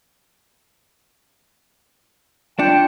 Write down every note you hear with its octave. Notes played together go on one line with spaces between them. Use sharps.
D4 F4 G5 A5 C#7